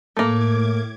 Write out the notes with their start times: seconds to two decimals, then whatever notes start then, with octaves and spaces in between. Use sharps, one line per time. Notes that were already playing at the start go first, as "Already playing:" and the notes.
0.17 A2 A3 A#3 D6 G#6